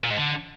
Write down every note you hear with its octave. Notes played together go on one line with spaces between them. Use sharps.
A#2
G#2
D3